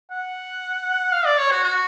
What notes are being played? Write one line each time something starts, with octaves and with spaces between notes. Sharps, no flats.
F#5
F5
D5
C#5
F#4
F#4